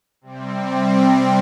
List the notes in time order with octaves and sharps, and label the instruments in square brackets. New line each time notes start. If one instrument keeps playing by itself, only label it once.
[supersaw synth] C3 G3 C4